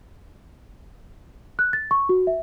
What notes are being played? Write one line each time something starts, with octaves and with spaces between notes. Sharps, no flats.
F#6
A6
C#6
F#4
E5